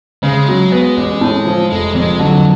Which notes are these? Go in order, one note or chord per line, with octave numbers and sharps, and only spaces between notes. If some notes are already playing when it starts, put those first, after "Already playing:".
C#3 G#3
F#3
B3
A1
A2
F3
F1 G#3
F2 G#3
D3 F#3